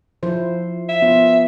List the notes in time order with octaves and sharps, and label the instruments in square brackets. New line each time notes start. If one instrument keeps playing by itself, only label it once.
[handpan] F3 E4 C5
[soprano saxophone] E5
[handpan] B3 F4